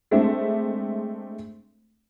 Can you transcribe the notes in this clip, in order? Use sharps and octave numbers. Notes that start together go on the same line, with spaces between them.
G#3 A3 C4 D4 E5